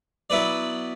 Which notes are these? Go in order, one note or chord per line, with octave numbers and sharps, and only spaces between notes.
F#3 B3 E4 B4 D5